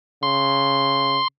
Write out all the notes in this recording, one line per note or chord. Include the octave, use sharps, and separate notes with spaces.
C#3 C6